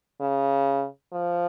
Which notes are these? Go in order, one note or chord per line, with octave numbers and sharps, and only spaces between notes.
C#3
F3